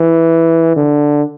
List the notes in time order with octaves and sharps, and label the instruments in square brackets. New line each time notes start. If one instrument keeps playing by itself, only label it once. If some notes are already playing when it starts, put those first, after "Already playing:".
Already playing: [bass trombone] E3
D3